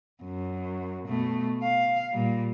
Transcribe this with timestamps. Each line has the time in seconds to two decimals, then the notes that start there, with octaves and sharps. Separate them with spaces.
0.23 F#2
1.08 B2 A3
1.63 F5
2.12 A#2 G3